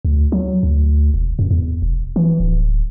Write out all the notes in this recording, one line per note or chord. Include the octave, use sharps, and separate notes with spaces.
D2
F#3
D2
E1
F#2
E2
E1
E3
D1